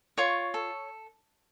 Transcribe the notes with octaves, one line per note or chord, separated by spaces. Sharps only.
F4 C#5 C#6
A4